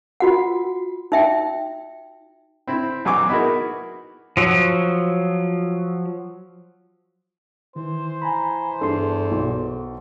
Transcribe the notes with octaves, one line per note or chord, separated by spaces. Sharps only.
F4 F#4 F#5
D#4 E5 G5
C4 E4
B1 F#3 G#5 C#6 D6
B3 D#4 E4 F#4 G#4 A#4
F3 F#3
D#3 E3 C5
G#5 A#5 B5
E2 G2 A4 C6
B1